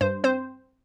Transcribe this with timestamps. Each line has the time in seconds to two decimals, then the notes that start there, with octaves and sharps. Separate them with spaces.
0.01 G2 C5
0.24 C4 C5